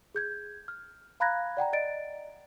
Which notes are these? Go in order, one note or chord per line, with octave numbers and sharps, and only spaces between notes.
G#4 G6 G#6
F6
F5 A#5 B5 F#6 G#6 A#6
D5 F#5 G5 A#5
D5 D#5 A6 D7